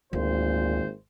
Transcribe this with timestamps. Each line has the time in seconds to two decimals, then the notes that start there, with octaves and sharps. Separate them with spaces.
0.13 G#1 D2 A#2 C5